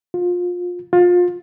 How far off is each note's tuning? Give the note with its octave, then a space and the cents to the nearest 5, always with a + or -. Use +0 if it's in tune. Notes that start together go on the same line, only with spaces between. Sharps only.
F4 +25
F4 +25